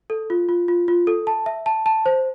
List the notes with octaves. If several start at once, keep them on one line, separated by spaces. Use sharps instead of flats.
A4
F4
F4
F4
F4
A4
A5
E5
A5
A5
C5